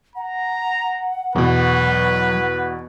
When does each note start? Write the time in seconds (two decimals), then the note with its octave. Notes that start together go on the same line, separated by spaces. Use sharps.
0.16 F#5 A#5
1.35 E2 B2 F#3 B4 B5